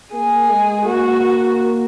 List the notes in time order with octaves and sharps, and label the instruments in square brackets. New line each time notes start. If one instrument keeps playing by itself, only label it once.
[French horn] A#3 [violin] G#4
[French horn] G#3
[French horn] A#3 [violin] F#4